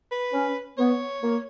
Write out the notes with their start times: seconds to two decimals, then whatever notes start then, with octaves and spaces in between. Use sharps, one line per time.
0.12 B4
0.33 C#4
0.78 B3 C#5
1.22 A#3